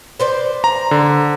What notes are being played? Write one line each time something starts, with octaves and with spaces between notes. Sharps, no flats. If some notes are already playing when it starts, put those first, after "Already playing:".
B4 C5 D5
A#5
D3